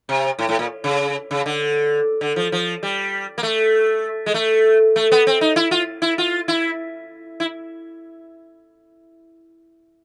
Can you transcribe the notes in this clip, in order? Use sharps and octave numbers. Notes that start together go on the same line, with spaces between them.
C3
A2
A2
A#2
C#3
C#3
D3
D3
F3
F3
G3
A#3
A3
G#3
A3
A3
B3
C4
D#4
E4
F4
E4
F4
E4
E4